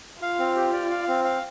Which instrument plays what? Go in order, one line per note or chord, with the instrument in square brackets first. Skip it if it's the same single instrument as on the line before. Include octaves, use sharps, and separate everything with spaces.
[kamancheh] F4 [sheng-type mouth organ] F5
[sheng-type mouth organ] C4
G4
D5
F5
C4
F5